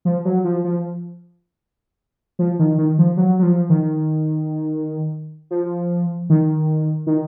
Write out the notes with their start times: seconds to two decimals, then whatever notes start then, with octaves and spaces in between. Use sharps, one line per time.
0.05 F3
0.25 F#3
0.44 F3
0.64 F3
2.39 F3
2.59 D#3
2.78 D#3
2.98 F3
3.17 F#3
3.39 F#3
3.43 F3
3.69 D#3
5.51 F3
6.30 D#3
7.07 D#3